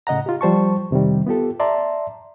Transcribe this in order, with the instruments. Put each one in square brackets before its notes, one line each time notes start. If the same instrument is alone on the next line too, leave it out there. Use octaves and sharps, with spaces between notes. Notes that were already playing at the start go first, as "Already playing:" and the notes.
[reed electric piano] A2 C#3 D#5 F#5 A#5
F4 G4
F3 G3 C5 A5 C#6
F2 C3 D#3 G3
B3 F4 G4 A4
D5 E5 A5 A#5 C6